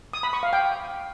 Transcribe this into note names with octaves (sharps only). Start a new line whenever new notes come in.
D#6
B5
C#6
F5
G5